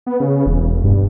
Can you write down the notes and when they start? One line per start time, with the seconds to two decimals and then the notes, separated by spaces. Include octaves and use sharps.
0.06 B3
0.20 C#3
0.46 E1
0.84 G2